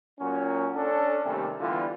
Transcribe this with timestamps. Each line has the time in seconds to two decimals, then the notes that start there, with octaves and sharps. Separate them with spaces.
0.19 A#2 F#3 C#4
0.75 C#4 D4 A4
1.24 D#2 C3 G3 A3 C#4
1.60 D3 E3 G3 B3 F4